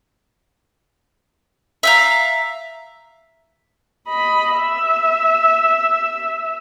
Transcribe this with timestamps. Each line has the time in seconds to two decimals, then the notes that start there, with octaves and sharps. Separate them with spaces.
1.83 E5 F5 A#5
4.08 D#5 B5
4.57 E5